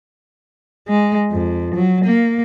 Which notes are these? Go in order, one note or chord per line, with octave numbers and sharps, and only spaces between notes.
G#3
F2
F#3
A#3